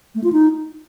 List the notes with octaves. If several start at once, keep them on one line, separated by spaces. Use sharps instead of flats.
A3
F4
D#4